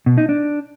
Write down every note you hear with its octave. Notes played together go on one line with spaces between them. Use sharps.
B2
D#4
D4